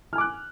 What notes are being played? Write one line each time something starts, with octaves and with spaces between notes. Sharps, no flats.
G#5 D6 F6 F#6